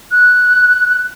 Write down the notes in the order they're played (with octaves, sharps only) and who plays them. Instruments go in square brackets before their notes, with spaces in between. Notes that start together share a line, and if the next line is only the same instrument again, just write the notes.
[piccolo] F#6